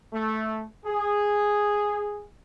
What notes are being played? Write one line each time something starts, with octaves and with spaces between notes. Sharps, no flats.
A3
G#4